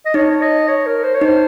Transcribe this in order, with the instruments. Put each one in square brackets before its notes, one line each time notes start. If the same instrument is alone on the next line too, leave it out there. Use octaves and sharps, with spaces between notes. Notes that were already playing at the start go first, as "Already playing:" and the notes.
[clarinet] D#5
[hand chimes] D#4 [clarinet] C#5
[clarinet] C#5
D#5
C#5
A#4
C5
C#5
[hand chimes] D#4 [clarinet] C5